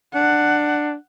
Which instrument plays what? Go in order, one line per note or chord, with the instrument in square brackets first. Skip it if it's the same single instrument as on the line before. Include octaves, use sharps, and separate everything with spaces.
[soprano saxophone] D4 [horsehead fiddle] F#5